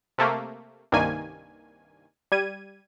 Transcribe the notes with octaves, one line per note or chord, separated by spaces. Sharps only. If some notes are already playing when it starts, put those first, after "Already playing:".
C3 A3 A#3
C2 G2 D#3 A#3 G#5
G3 G#6 D#7